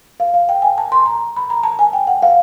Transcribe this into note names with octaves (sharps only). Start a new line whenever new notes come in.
F5
F5
G5
G#5
A5
C6
A#5
B5
A#5
A5
G#5
G5
F#5
F5